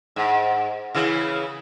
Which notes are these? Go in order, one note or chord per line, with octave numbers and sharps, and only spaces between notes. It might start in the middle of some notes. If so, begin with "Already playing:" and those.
G#2
C#3 E3 E4